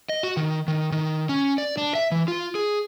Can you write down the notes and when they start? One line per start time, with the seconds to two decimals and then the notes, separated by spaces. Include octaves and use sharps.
0.09 D#5
0.23 F#4
0.37 D#3
0.68 D#3
0.92 D#3
1.29 C#4
1.58 D5
1.78 D4
1.95 E5
2.11 E3
2.28 F4
2.55 G#4